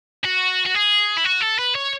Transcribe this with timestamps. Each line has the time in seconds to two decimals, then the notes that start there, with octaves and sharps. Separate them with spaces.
0.25 F#4
0.66 F#4
0.75 G#4
1.17 E4
1.25 F#4
1.41 A4
1.59 B4
1.75 C#5